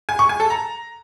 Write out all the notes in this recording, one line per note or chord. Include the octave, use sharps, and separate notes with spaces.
G#5
C#6
G#5
A4
A#5